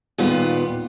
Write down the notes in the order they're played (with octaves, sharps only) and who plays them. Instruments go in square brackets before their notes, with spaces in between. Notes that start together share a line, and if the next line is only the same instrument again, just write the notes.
[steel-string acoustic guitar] D#2 A#2 G3 B3 F4